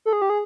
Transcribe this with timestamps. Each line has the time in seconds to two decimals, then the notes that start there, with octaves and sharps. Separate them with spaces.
0.06 A4
0.13 G#4
0.22 G4
0.30 G#4